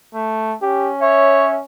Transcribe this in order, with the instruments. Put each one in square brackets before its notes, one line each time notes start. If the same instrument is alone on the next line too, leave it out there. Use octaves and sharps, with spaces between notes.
[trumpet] A3
[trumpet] C#4 [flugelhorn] G4
[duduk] C#5 [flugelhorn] E5